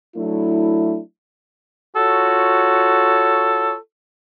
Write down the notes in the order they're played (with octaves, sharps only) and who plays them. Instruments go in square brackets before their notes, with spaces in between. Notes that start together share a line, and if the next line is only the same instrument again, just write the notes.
[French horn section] F#3 A3 D4 E4
[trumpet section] F4 F#4 C#5 [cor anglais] A4